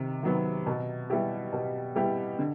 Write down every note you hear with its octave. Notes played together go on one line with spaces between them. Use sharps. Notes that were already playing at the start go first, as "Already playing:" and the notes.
Already playing: C3 D#3
D#3 F#3 B3
B2
G3 B3 E4 G4
B2
G3 B3 E4 G4
D3